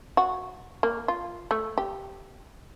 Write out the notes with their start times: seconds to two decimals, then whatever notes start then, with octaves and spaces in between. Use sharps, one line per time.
0.17 F#4
0.83 A#3
1.08 F4
1.51 A3
1.78 G4